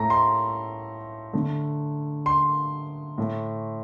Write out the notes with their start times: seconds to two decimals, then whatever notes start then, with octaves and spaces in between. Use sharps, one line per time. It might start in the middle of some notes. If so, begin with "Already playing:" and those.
Already playing: A2 A3 A#5
0.10 C6
1.33 D3 A3
2.26 C6
3.18 A2 A3